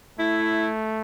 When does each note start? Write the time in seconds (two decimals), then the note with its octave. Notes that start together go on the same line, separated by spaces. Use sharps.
0.19 A3 E4